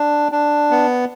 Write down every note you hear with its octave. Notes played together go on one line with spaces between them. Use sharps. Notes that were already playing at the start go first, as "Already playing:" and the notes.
Already playing: D4
D4
B3